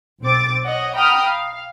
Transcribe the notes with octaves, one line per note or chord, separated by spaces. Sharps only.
B1 C4 D6 A6
C#5 D#5 F#5
F#5 G5 A#5 B5 D#6 F6
F5